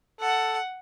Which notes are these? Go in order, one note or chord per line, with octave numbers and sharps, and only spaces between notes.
A4 F#5